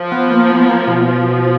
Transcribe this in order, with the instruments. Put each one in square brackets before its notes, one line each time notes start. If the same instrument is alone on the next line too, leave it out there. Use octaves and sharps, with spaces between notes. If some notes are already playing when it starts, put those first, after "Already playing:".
Already playing: [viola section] F3
[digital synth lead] B3
A#3
B3
A#3
B2
[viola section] F3